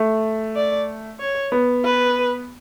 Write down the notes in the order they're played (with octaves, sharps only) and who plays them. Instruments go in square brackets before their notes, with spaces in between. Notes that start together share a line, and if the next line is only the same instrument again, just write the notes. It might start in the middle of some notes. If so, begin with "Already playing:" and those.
Already playing: [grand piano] A3
[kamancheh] D5
C#5
[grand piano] B3
[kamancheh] B4